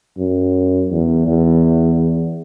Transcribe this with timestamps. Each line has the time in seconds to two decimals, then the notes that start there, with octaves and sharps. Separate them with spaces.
0.18 F#2
0.91 E2
1.27 E2